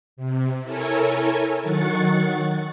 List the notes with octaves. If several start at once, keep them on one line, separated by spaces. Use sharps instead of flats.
C3
E4 A4 A#4 C#5 G#5
D#3 F#3 F#5 C#6 A6 C#7